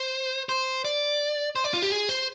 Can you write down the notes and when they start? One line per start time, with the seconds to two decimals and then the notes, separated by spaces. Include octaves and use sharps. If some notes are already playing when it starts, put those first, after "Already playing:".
Already playing: C5
0.49 C5
0.85 D5
1.56 C5
1.64 D5
1.73 F4
1.82 G4
1.91 G#4
2.09 C5